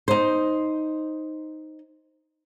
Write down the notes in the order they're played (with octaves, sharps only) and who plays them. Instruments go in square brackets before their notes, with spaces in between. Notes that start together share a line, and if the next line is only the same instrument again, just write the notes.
[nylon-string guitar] D#4 C5